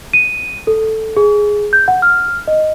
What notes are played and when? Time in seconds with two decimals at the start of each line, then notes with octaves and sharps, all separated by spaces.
0.13 D#7
0.67 A4
1.17 G#4
1.73 G6
1.88 F#5
2.02 F6
2.48 D#5